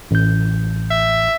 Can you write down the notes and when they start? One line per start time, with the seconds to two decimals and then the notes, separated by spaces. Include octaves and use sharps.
0.11 A1 G6
0.90 E5